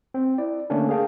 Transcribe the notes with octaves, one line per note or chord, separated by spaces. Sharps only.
C4
E4 D5
D3 A3 A#3 C#4 D4
G#4 A#4 F5 G5 A5